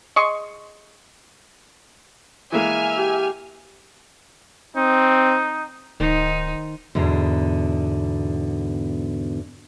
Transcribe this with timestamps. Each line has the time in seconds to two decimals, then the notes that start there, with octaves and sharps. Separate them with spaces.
0.16 G#4 D#5 C6 C#6
2.52 E3 G#3 A#3 E5 G#5 F6
2.98 G4
4.76 C4 D#4
6.00 D1 D#3 D#4 C5
6.95 E2 G#2 B2 D3